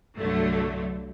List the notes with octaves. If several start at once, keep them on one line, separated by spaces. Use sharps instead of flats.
C2 G2 D3 F#3 A3